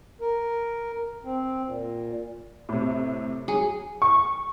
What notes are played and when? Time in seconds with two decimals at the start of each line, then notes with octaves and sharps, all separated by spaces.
0.21 A#4
1.25 C4
1.65 A#2
2.69 A2 C3
3.48 F#3 G#4
4.02 C#6